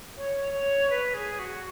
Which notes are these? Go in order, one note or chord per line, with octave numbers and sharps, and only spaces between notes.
C#5
C#5
B4
G#4
F#4